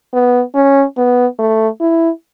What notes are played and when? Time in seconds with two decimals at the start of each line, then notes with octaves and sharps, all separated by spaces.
0.13 B3
0.55 C#4
0.97 B3
1.39 A3
1.80 E4